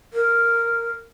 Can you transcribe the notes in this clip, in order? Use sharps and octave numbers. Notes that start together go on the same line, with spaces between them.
A#4